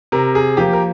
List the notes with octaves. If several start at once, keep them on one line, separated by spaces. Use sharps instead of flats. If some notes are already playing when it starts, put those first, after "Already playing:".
C3 A#4
G#4
F3 A#3 G4
A#4